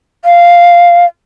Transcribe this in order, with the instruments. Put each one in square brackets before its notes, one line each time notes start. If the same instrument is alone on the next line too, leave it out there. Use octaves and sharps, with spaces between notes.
[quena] F5